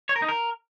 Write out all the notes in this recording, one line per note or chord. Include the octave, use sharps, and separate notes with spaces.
C#5
A#4
D#4
A#4